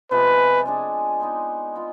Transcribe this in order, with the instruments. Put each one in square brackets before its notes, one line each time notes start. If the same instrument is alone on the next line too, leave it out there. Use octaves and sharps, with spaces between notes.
[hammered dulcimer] C3 F3 G#3 B3 [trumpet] B4
[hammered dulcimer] G#3 D4 G#4
B3 D#4 G#4 C5
G#3 B3 F4